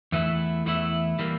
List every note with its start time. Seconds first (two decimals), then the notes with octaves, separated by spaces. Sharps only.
0.12 E2 E3 A3 E4
0.65 E2 E3 A3 E4
1.19 E3 G3 A#3